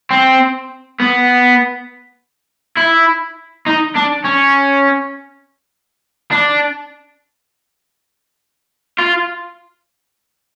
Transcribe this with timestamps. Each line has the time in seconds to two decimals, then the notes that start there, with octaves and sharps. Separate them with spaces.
0.11 C4
1.00 B3
2.77 E4
3.66 D#4
3.96 D4
4.25 C#4
6.31 D4
8.98 F4